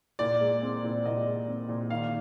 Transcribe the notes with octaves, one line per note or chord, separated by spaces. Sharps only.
A#2 D5
G#3
C4
A#2
A#2 D#5
G#3
C4
A#2
D#3 F5